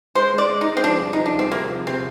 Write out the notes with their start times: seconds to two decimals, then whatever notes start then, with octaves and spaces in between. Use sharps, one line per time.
0.15 G#3 C5
0.33 G#3
0.38 D5
0.49 G#3
0.61 D#4
0.67 G#3
0.77 C4
0.83 F3 D4
1.00 C2
1.13 D#4
1.18 F3
1.26 D4
1.34 C2 C4
1.52 C3 A#3
1.69 F3
1.87 C3 C4